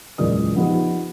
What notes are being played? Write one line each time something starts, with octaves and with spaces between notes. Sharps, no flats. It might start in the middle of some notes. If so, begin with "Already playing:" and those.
F#1 E2 A#2 G#3 D5 D#6
F3 B3 D#4 G4